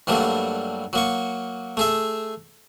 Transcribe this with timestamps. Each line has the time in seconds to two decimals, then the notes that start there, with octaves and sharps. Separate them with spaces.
0.07 G2 F#3 G3 A3 A#3
0.93 F#3 A#3 C#6
1.77 A3 G#4 E5